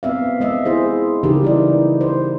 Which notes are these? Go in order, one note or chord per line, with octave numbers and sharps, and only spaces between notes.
B3 C4 E5 F5
G#3 D#5 E5
E4 G#4 C5
C#3 E3 D#4 G4 A#4
G3 E4 D5
C5